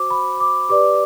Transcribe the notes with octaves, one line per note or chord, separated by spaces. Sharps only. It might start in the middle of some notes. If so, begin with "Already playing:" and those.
Already playing: F#4 C5 D6
B5
D6
G4 B4 D5 D6